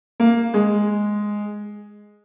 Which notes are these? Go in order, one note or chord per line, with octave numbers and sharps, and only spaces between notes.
A#3
G#3